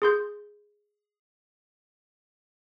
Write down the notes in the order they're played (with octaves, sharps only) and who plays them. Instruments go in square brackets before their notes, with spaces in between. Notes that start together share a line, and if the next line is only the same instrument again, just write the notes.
[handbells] G#4 C6 G6